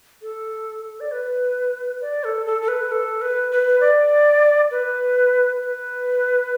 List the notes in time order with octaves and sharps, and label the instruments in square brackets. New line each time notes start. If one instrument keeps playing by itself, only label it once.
[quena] A4
D5
B4
D5
A4
A4
A4
B4
A4
B4
B4
D5
B4
B4